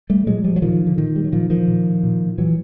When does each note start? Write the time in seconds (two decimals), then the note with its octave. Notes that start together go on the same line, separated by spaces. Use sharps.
0.10 G3 A3
0.27 A#2 F#3 G#3
0.44 F3 G3
0.56 F#3
0.62 A#2 D#3 F3
0.87 D3
0.97 A#2 D#3
1.16 G3
1.24 F#3
1.32 A#2 D#3 F3
1.50 D#3 F3
1.68 A#2
2.03 A#2
2.38 A#2 E3 F#3